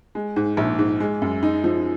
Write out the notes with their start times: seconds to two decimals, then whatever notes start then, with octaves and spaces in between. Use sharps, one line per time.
0.15 G#3
0.36 G#2
0.57 A#1
0.79 G#2
1.00 G#3
1.22 F#2
1.43 D#4
1.64 F3